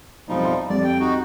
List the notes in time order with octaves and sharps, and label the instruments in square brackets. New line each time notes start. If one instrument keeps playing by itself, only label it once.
[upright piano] B1 F2 [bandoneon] F3 G3 D#4
[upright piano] E5 F5 C6
[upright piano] F2 G3 [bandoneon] D5
[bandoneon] G5
D#4 F#4